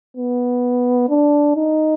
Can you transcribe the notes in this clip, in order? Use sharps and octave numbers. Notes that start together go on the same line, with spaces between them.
B3
D4
D#4